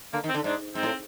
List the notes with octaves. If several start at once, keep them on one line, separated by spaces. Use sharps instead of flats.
D3 A#3
D#3
C4
D3
G#2 D4
G#2 C4
A2